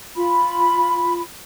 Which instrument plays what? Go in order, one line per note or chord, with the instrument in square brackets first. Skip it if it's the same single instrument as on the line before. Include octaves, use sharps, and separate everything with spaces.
[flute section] F4 B5